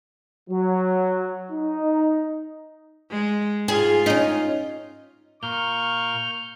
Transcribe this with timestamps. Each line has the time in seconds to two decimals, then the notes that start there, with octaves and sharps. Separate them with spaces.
0.50 F#3
1.52 D#4
3.10 G#3
3.68 G#2 F4 G#4
4.06 C#4 D#4
5.43 A#2 A#4 F5 C#6 F6 G6